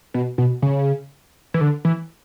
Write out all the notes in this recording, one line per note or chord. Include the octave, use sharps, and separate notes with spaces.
B2
B2
C#3
E3
D3
E3